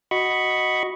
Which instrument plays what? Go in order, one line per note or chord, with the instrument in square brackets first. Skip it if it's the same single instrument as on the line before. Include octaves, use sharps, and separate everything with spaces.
[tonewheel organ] F#4 D#5 B5 C#6